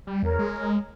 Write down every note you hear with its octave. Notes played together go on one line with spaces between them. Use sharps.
G3
E2 A#4 C#5
G#3